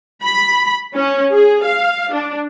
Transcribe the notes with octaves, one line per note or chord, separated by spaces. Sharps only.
B5
C#4
G#4
F5
D4